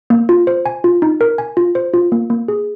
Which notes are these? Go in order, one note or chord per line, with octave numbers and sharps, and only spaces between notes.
A#3
F4
C5
G#5
F4
D#4
A#4
G#5
F4
C5
F4
A#3
A#3
G#4